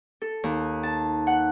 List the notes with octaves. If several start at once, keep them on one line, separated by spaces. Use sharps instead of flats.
A4
D#2
A5
F#5